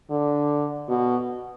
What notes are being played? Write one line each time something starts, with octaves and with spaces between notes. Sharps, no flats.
D3
B2